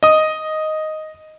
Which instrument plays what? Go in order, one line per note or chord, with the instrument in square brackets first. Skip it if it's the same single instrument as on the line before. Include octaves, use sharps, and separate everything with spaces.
[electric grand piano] D#5 D#6